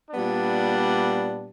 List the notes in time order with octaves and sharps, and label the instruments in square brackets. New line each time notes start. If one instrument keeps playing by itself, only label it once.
[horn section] A#2 G3 B3 D4